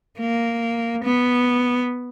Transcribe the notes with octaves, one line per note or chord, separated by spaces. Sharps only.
A#3
B3